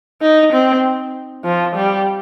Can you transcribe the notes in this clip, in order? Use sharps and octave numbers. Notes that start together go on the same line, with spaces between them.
D#4
C4
F3
G3